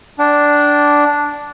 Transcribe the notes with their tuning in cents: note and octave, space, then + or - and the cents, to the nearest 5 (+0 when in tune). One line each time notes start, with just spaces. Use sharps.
D4 -5 G5 -40